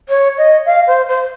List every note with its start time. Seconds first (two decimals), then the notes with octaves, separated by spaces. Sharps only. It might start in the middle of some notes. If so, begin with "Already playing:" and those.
0.09 C#5
0.38 D#5
0.66 F5
0.87 C5
1.08 C5